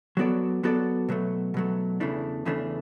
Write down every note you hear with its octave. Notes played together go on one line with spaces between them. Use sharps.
F#3 B3 F#4 A4 D5
F#3 B3 F#4 A4 D5
B2 F#3 A3
B2 F#3 A3
E2 C#3 E3 A3 D4
E2 C#3 E3 A3 D4